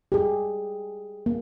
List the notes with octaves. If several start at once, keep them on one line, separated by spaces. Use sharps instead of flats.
G4 G#4
A#3